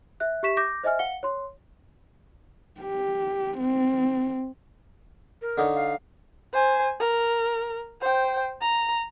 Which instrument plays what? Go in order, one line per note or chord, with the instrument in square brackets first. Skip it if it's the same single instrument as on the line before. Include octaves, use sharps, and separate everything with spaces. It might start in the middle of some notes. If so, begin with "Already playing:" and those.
[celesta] E5 F#6
G4 E5 C#6 B6 E7
D6 G6 A#6
C5 D#5 E5 G#5 F6
F5 F#5 C#7 G7
C#5 C6
[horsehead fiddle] G4
C4
[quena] A#4
[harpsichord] D3 D#4 C#5
[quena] F5
[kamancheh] C5 G#5
A#4
C5 G5
A#5